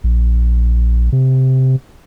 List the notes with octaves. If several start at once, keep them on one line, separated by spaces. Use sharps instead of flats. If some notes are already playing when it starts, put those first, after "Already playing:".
A#1
C3